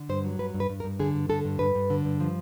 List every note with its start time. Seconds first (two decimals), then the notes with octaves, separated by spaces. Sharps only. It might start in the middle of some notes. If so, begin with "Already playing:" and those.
Already playing: D3
0.09 G2 C5
0.25 F#3
0.39 G2 B4
0.54 G2
0.60 B4
0.70 G2
0.80 A#4
0.84 G2
1.00 D3 G#4
1.15 G2
1.29 D3 A4
1.45 G2
1.59 G2 B4
1.75 G2
1.90 D3
2.05 G2
2.20 F3